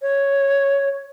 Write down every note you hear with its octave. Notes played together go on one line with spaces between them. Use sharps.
C#5